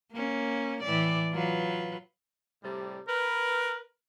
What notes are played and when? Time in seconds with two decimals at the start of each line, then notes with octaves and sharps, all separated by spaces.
0.12 A#3 C#4
0.83 A2 E3 D5
1.33 F#3 F4 B4
2.63 A2 C3 G3
3.08 A#4 B4